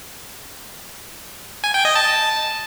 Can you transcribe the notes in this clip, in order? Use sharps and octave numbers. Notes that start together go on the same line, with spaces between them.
G#5
G5
D#5
A5